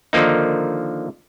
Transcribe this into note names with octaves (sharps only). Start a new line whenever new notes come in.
D3 D#3 F3 A#3 D#4